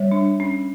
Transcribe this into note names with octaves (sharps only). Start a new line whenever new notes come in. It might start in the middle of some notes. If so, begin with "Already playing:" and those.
Already playing: G3 C#5 E5
D4
C#4